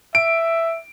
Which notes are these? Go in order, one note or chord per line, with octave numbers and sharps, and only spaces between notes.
E5 D7